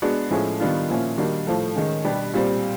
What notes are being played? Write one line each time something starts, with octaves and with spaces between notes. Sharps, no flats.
G#3 B3 D4 F#4
A2 F3 G#3 C#4 E4
D#3 G3 B3 D4 F4
A#2 F3 A#3 C#4 E4
D#3 G3 A#3 D4 F#4
A2 F3 A3
D#3 G#3 C#4
B2 G3 B3 D4 G4
A#2 G3 C4